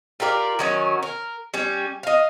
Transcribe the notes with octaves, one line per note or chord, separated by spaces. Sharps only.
F4 G4 A#4 D5
D#3 F#3 C#4
A#4
G3 C#4
D#5 F5